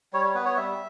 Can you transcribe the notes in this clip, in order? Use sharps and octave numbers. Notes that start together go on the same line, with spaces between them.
G3 C#5
C#5
B3 B4
C#5
G3 E5